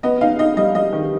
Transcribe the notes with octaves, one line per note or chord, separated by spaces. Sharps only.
B3 D#5
D#4 F5
D#4 D#5
G3 D#5
G3 D#5
D#3